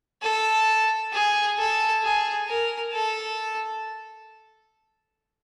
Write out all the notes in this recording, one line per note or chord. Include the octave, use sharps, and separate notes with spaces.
A4
G#4
A4
G#4
A#4
A4